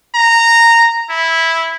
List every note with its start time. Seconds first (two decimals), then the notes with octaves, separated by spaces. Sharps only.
0.15 A#5
1.10 E4